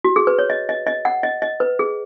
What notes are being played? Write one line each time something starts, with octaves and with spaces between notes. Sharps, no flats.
F#4
G#4
B4
C#5
D#5
D#5
D#5
F#5
D#5
D#5
B4
G#4